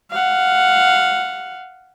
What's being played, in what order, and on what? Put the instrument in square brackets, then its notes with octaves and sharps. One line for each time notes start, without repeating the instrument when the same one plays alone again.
[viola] F5 F#5